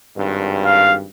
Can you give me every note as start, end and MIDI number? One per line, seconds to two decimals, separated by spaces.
0.17 1.06 32
0.17 1.06 43
0.66 0.95 77